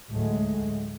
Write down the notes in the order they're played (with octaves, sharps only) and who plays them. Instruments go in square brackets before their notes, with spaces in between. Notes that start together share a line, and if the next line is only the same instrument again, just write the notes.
[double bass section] D2 A2 F#3 G#3 A3